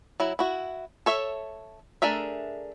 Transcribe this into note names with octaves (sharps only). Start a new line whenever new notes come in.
F#3 E4
E4 F#4
A4 C#5 E5
A3 D4 G#4 A#4 E5